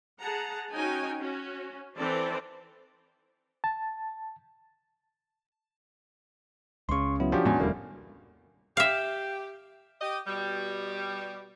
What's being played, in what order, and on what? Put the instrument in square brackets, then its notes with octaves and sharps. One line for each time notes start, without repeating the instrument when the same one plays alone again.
[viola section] G#4 F#5 A5 A#5
C#4 D#4 F#4 C#5 G5 G#5
C#4 F#4
E3 C4 A4 B4 C5 D5
[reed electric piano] A5
[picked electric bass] C#2 C#3 [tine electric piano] C6 C#6
[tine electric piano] F#3 B3 E4
[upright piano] F3 G4 [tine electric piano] C#4 D4 F#4
[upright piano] E2 G#5 [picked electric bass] A2 G#3 B3
[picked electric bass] F1 D#2 G3 [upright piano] A2 A#3
[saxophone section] G4 [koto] E5 F5
[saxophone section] G4 D#5
B2 G3